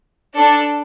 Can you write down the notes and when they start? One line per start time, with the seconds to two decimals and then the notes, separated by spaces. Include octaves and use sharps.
0.36 D4 A4